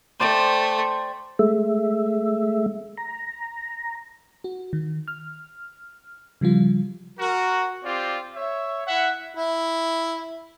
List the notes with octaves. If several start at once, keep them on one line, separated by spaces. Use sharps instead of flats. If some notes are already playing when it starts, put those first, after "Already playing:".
A3 C5 D5 G5
G#3 A3 E5
A#5
F#4
D#3
F6
C#3 F3 G3 F4
F#4 A#4
C4 F4 G4 D5
C#5 E5
E4 E5 F#5
E4